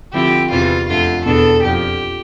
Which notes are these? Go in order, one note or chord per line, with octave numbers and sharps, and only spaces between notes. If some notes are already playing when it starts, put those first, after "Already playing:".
D3 F3 C4 E4 G4
E2 C3 E3 G3 F4
F2 D3 A3 F4
E2 B2 B3 D4 A4
F2 D3 F3 G4